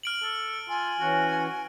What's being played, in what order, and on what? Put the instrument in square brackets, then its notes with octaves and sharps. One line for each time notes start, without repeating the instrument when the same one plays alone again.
[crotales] F6 D7 F#7
[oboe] A4
[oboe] F4 [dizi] G#5
[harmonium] E3 C#4 [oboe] F#4